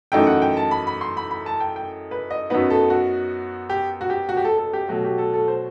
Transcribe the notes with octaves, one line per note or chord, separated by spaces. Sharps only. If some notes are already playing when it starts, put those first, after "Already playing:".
F#2 E3 A3 D#4 G5
F#5
G5
A5
B5
B5
C6
B5
B5
A5
G5
G5
B4
D#5
F#2 F#3 B3 D#4 B4
A4
F#4
G4
F#4
G4
F#4
G4
A4
A4
G4
B2 F#3 A3 F#4
G4
A4
A4
C5